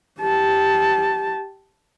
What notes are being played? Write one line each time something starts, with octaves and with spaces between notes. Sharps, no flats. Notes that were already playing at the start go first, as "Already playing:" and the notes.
G4 A5